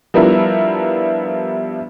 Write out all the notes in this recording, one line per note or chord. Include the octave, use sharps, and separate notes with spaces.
F3 G3 B3 D4 E4 A#4